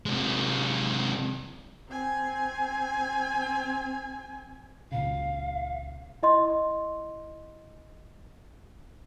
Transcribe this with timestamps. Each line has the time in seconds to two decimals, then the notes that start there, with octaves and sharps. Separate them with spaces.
0.06 C3 G#3
1.89 C4 G#5
4.92 C#2 A#2 C#3 F5
6.23 E4 D#5 C6